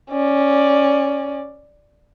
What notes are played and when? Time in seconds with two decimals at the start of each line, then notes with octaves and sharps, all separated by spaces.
0.11 C#4 D5